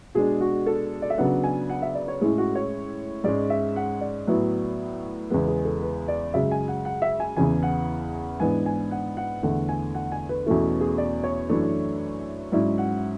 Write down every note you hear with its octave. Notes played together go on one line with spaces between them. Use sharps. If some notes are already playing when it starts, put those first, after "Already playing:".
B2 G#3 D4 G#4
F#4
A4
D5
E5
C#3 F#3 B3 D4 F#5
G#5
F#5
E5
D5
C#5
A2 G#3 C#4 E4 G#4
F#4
C#5
G#2 G#3 C#4 D5
E5
F#5
D5
A2 F#3 B3 E4
E2 C#3 G#3 B3 B4
G#4
A4
B4
D5
F#2 C#3 G#3 E5
G#5
F#5
F#5
E5
G#5
E2 C#3 E3 G#5
F#5
G#2 E3 B3 D4 G#5
G#5
F#5
F#5
E2 D3 A3 F#5
G#5
F#5
G#5
B4
E2 B2 A3 C#4 E4 A4
G#4
D5
C#5
F#2 E3 A3 D4
G#2 F#3 C#4 E4 D5
F#5